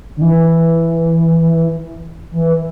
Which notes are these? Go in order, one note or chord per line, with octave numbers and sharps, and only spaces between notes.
D3
E3
E3